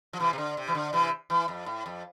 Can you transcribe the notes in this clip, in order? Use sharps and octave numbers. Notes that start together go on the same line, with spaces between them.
F3
C3 E3
C3
D3
C3
E3
D3
C3 E3
E3
F2
A2
F2